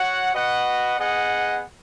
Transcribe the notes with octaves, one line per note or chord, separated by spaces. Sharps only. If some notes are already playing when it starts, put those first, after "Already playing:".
Already playing: F#4 C#5 F#5
F#4 B4 D#5 F#5
B3 G#4 D#5 F#5